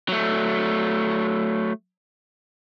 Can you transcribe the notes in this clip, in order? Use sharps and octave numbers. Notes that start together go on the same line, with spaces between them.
F#3 A3